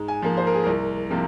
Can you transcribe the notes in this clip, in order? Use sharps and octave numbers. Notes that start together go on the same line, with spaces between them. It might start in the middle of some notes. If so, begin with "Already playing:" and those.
Already playing: G#2
G#5
F3 A#3
C5
A#4
G#4
C2 A#4
C3 F3 A#3